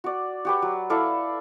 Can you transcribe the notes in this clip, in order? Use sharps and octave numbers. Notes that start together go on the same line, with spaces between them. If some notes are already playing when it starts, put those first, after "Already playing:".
F#4 D5
F#4 G4 B4
F#3
E4 A4 D5 F5